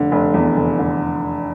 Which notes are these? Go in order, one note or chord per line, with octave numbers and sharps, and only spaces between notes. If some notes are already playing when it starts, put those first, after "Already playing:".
Already playing: F1 D3
F1
E2
F1
D3